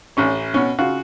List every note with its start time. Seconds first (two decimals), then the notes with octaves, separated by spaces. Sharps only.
0.17 A1 C#4 C#5
0.54 B2 C#4
0.79 C#3 F4 F#4